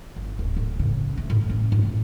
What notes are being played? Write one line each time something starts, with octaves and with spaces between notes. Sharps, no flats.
G1
D1
A2
C#3
A3
A2
C#4
A2